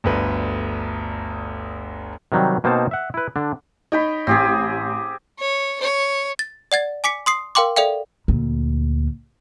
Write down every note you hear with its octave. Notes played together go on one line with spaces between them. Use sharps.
G1 D2 B4
C3 D#3 F#3 G3
B2 A#3 C4 D#4 C5 A5
E5 F#5
E4 B4
D3 D4
D#4 C#5 G5 B5
A1 C4 G4 G#4
C#5
C#5
A6
D5 F#5 G#6 A6
G#5 D6 B6 C#7
C6 D#6 C7
A#4 F5 G5 C6 D6
A4 D5 E5 F5 G5
D2 A#2